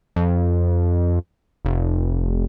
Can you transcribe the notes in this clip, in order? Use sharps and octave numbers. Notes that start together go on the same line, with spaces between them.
F2
F1